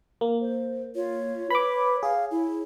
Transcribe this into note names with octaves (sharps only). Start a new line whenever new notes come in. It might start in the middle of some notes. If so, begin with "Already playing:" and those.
A#3
C5
F4 C#5
B4 B5 D6
G#4 F5
E4